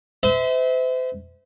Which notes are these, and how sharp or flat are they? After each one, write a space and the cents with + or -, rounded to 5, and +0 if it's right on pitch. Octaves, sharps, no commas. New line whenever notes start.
C5 -40 E5 -30